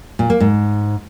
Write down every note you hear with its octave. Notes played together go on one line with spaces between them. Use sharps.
A#2
A#3
G#2